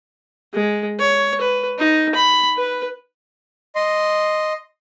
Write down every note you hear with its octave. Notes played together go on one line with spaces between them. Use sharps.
G#3
C#5
B4
D#4
B5
B4
D#5 C6